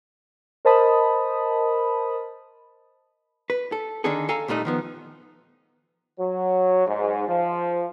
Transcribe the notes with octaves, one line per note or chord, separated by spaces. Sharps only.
A#4 C5 D#5 A5 B5 D#6
B4
A4
D3 D#3 D4 D#4 G#4 A4
A4 F5 G#5 A#5
C2 A#2 A3 D#4
D#3 F3 B3
F#3
G#2
F3